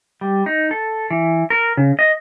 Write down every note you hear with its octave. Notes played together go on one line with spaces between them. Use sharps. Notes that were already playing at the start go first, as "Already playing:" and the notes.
G3
D#4
A4
E3
A#4
C#3
D#5